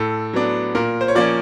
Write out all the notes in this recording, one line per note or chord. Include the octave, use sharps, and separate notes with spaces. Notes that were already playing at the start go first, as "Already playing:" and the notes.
Already playing: A2 A4
F#3 B3 D4
A#2 A#4
C5
C#5
F3 A#3 C#4 D5